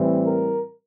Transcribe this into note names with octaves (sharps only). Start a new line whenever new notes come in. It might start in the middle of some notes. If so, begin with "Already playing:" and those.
Already playing: A2 E3 G3 C4
A#4